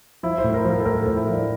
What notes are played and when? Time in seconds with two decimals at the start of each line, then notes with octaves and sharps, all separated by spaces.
0.23 F3 E4
0.38 C5
0.44 A2
0.49 C5
0.54 A#4
0.65 F3
0.70 A#4
0.80 A4
0.86 A2 A#4
1.02 A2 A4
1.17 E4
1.28 F3
1.33 D4